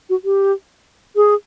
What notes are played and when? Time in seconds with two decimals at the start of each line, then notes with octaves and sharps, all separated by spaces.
0.10 F#4
0.24 G4
1.16 G#4